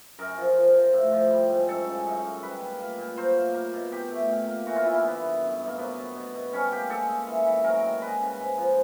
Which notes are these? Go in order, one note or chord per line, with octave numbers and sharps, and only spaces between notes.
F#2 A#4
F3
F3
F3
A2
F3
G3
G#2
F#2 A4
C#3
F#2
F#2
G3 B4
A#2
A#3
A#2
F#3 C5
A#3
A#3
B2
B2 G4
A3
A#2
A#3
E3 F#4
F4
E3 E4
A#3
D3 B3
G2
F#2
F#2
A#3
F#3 B3
F#3
B2
B2
G3 C#4
A#3 G4
G#3 A4
G#3
E3
E3
F#3 A#4
D#3
G#3 B4
C#3
G#2
F3